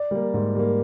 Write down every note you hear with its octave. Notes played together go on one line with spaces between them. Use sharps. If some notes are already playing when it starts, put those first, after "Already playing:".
Already playing: D5
G3 A#3
G#2
G3 A#3